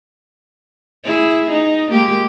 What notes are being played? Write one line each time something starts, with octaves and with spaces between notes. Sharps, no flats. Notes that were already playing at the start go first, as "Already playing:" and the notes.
E4 G#4
D#4
G#3 A#3 G4